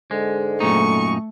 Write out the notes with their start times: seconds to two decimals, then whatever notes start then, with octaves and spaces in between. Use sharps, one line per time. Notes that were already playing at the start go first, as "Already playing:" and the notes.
0.11 G#2 D3 G#3
0.60 F#2 A#2 A3 D#4 C#6